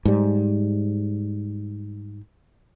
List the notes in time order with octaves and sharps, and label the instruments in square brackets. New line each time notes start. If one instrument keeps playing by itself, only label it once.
[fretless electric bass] G#2 G3